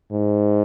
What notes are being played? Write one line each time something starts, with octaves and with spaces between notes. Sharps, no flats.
G#2